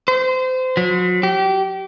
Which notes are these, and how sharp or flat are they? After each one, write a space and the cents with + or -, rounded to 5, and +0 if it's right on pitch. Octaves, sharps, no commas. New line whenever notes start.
C5 -25
F#3 -35
G4 -25